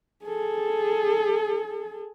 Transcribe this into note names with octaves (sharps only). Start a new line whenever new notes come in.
G#4 A4